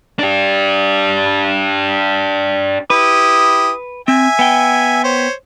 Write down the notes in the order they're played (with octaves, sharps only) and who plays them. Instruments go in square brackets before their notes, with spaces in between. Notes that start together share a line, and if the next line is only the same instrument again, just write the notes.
[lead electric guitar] D4 G4
[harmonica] E4 G4 D#6 [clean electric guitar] B4
[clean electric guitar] C4 [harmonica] E5 G#5
[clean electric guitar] B3 G5
[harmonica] C5 C#5